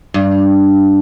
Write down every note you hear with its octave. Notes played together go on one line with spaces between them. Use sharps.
G2